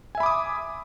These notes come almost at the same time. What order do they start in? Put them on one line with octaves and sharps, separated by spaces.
G#5 E5 B5 D6 D#6